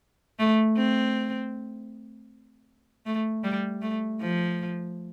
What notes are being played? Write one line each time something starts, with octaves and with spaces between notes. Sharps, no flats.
A3
C4
A3
G3
A3
F3